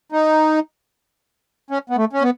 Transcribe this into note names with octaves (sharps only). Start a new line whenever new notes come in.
D#4
C#4
B3
A3
C#4
B3